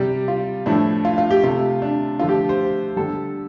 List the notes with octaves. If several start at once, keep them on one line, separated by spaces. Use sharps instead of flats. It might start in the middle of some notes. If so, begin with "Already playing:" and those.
Already playing: C3 G3 G4
F4
A2 F3 A3 D4
F4
F4
G4
C3 A3 F4
D4
D3 F3 A3 F4
G4
C5
D3 G3 A4